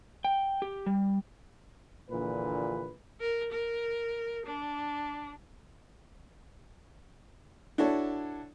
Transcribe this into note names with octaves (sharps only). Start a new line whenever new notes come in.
G5
G4
G3
A#1 A#2 D3 E3 B4
A#4
A#4
D4
D4 E4 F#4 A4 C#5